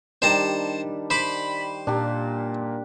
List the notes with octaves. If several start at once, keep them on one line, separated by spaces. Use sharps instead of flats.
D#3 G3 D4 C5 A5 A#5
C5 B5 D6
A#2 D4 G4